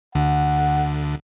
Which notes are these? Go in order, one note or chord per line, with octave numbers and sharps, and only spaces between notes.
D2 D3 F#5